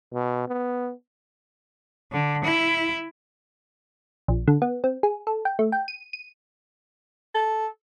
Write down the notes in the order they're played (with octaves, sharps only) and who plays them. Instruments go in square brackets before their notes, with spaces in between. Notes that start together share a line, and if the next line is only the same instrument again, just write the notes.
[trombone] B2
B3
[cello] D3
E4
[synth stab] A#1
D3
B3
C4
G#4
A4
G5
A3
G5
D#7
D#7
[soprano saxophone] A4